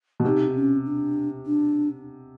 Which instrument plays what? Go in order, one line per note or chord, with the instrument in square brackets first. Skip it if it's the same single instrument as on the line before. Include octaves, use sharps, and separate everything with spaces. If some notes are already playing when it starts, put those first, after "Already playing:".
[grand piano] B2
[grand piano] C3 [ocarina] D#4
[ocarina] C#4
D4
D4